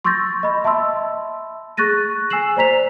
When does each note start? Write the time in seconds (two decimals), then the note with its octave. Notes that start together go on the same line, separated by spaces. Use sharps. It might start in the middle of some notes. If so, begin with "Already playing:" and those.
0.04 C6 C#6 E6 G6 A6 A#6
0.43 D#5 B5
0.64 E5 A5 B5 C6 E6
1.77 G#4 C#6 F#6 A6 A#6 D#7
2.30 G#5 E6 C7 E7 F#7
2.57 C5 D5 A#5 B6 F7